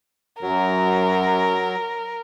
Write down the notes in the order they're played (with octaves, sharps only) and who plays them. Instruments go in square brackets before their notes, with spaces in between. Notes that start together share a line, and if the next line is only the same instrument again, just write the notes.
[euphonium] F#2 [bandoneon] F#3 [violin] A#4